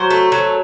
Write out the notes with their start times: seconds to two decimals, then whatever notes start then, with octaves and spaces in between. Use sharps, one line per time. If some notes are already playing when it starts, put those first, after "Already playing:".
Already playing: F#3 C5
0.10 A3
0.32 F#3